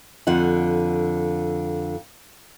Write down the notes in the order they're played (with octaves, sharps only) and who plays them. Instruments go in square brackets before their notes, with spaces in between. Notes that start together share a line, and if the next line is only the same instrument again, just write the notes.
[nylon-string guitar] F2 D3 F4 F#5